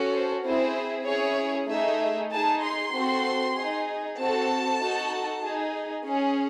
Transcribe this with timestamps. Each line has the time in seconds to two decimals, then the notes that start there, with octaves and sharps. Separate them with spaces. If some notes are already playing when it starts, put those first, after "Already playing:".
Already playing: C#4 F#4 A4
0.13 C5
0.44 C4 E4 G#4 C5
1.07 C#4 E4 G#4 C#5
1.69 A3 D#4 G#4 E5
2.32 D#4 G#4 A5
2.63 C6
2.94 C4 F#4 A4
3.56 D#4 G#4
4.18 C4 F#4 A4 A5
4.80 D#4 F#4 A4
5.43 D#4 G#4
6.05 C#4 G#4